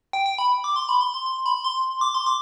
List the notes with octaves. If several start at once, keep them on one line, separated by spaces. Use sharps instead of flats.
G5
G5
B5
D6
C6
B5
C6
C6
C6
B5
C6
D6
C6
D6